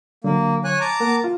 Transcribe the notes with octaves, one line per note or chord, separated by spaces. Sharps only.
D3 F#3 A#3
C#5 G#5 F#6
A5 A#5 D6
A#3 A#4 F#5
F4